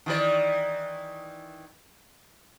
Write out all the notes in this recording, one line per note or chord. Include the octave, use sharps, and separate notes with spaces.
D#3 E3 D5